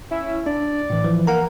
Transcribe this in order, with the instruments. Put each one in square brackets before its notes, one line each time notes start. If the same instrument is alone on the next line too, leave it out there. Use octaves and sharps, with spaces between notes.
[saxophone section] C#4 E4
[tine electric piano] D4 [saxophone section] D5
[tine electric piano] A2 E3
E3 F3
[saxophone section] A#3 [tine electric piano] F#5 A#5